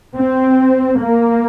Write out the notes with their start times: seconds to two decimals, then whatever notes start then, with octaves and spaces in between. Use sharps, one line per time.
0.17 C4
1.00 A#3